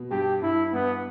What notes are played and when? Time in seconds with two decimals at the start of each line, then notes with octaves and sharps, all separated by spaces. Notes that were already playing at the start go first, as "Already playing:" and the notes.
Already playing: B2
0.11 G2 G4
0.42 G2 E4
0.73 G2 B3